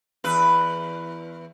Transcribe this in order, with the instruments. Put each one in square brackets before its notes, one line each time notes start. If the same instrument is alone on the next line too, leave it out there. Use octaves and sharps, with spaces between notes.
[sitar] E2 B4